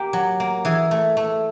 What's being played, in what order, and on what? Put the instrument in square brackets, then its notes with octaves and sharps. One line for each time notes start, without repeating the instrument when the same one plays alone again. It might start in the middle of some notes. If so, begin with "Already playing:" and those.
Already playing: [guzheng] A#3 G4
F#3
A#3
E3 G#4
A3
A3